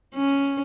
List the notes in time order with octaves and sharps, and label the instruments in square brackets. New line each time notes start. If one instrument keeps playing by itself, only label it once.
[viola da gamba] C#4